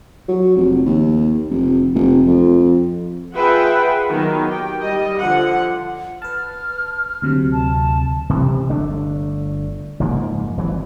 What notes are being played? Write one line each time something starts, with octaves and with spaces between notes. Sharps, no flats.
F#3
F1
D#2
F1
F1
F2
F4 G#4 B4 E5 F#5 G5
D#3 F#3 B3
G4 G5
G3 D#5
D3 F3 F#5
B4 A5 F6
D2 C3 F#3
A5
C3 E3
G1 A3 D4
F#1 G#2 F3 A#3
G#1 E3 F#3